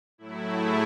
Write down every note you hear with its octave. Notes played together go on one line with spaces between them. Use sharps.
A2 F#3 A3 E4
G#4